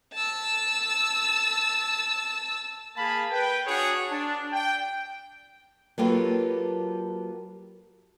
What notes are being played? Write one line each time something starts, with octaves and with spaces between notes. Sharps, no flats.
A5 E6
A#3 G#4 F5 A5 B5
B4 G5
D4 F#4 G#4 C#5 F#5
D4
G5
F#3 A#3 F4 G4 A4 B4